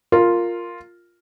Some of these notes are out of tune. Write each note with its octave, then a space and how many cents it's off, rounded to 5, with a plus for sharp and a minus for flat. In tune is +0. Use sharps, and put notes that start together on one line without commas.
F4 +0 A#4 -10